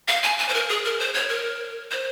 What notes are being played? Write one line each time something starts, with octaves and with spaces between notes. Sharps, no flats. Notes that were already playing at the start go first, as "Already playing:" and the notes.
F5
G#5
G#5
C5
A#4
G#4
A#4
C5
C#5
A#4
C5